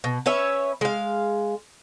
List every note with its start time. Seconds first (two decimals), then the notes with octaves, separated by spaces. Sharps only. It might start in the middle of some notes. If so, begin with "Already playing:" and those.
0.04 B2
0.26 C#4 B4 C#5 E5
0.81 G#3 F5